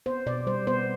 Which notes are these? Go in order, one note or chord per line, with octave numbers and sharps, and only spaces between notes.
B3 C5
B2 D5
G3 C5
B3 C5